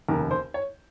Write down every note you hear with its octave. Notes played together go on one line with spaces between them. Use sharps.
F1 D#2 C#3 A#4
C5
C#5